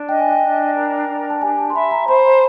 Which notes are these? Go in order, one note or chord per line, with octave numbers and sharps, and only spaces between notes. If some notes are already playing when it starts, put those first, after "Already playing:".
Already playing: D4
D#5 G5
G#5
G5
D4
A#4
D4
A5
G4 G#5
A5
C6
E5 B5
A#5
C5 B5